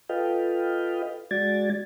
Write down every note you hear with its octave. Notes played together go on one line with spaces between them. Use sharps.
F4 A4 B4 D#5 F5 G5
G#3 F#4 D5 G#6 A6